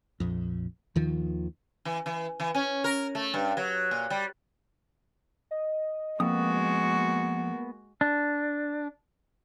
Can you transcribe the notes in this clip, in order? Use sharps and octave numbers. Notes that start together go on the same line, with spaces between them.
A#1 F2
D#2 D#3 F3
E3
E3
E3
C#4
A#4
A3
G2
F#3
A#2
G3
D#5
F2 G#3 A#3 B3 F#4 D#6
D4